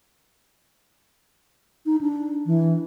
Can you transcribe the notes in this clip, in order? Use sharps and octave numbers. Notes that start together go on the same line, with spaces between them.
D#4
D4
E3